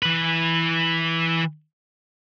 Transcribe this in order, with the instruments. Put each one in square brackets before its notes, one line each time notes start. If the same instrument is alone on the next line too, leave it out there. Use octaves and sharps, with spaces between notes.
[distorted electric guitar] E3 B4